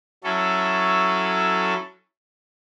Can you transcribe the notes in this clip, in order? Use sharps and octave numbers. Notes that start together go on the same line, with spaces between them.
F#3 C#4 E4 A4